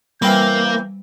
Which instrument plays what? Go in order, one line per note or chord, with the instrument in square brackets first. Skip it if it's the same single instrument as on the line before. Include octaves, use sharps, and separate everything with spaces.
[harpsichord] E3 C4 E4 [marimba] G3 [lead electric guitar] A#3 [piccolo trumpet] G6